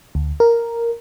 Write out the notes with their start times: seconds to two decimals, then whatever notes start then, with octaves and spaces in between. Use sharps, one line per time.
0.15 D2
0.40 A#4